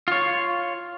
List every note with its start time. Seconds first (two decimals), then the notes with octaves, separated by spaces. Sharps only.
0.08 F4 C#5